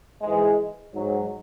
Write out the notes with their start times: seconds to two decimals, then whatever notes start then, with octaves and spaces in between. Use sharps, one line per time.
0.22 G#2 E3 G#3
0.93 G#2 F#3